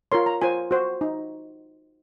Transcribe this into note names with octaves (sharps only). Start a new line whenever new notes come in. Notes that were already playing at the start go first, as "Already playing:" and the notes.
F4 A#4 C#5 C6
A#5
F4 C5 G#5
F#4 C5
D#4